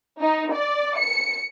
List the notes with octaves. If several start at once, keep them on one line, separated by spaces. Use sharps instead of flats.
D#4
D5
C#7